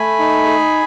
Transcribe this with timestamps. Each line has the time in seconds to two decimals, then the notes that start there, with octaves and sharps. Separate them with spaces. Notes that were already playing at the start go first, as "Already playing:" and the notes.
Already playing: A3 G#5 B5
0.19 D#4
0.46 G#4